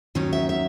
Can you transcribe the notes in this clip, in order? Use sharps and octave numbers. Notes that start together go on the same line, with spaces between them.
D#2 D#3 F#3 C#4
E5
E5